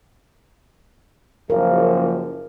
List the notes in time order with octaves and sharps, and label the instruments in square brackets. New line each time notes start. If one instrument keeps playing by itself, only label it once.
[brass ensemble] F#1 F3 [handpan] A#4